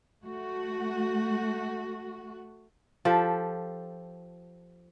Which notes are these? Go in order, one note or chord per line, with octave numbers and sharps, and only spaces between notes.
A3 F#4
F3 G4 A4